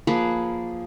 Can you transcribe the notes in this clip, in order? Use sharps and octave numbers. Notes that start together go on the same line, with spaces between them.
F3 A#3 G#4 B4